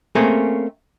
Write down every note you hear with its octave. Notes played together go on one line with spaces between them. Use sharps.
A3 A#3 C4 C#4 G#4